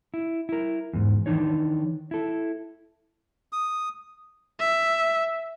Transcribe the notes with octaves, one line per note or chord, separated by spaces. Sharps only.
E4
E4 A#4
E2 G#2
D#3 E3 D4 D#4 C#5
E4 A4
D#6
E5